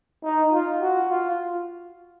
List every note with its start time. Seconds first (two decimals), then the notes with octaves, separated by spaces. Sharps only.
0.23 D#4
0.52 F4
0.81 F#4
1.09 F4